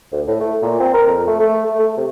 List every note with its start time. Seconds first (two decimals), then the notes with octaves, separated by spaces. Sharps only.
0.12 D2
0.27 A2
0.40 A3
0.62 A#2
0.80 C4
0.94 A#4
1.07 F2
1.27 A3
1.40 A3
1.66 A3
1.79 A3
1.97 C3